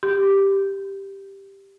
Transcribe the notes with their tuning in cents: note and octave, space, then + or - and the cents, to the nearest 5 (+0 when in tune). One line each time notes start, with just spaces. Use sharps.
G4 +0 C6 -35